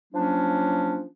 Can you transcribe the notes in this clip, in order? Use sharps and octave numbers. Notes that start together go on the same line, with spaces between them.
F3 F#3 A#3 C#4 D4